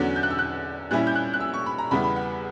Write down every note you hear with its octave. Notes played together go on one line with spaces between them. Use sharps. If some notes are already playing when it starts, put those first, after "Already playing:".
Already playing: E2 D3 F#3 C#4 F#6
G6
F#6
E6
F#6
A#2 G3 C#4 E4 F#6
G6
F#6
F#6
E6
C#6
B5
A#5
E2 C#3 G3 B3 E4 B5
B5
F#5